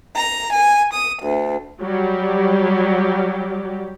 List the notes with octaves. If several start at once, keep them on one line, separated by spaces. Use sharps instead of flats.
A#5
G#5
D#6
D2
F#3 G3 G4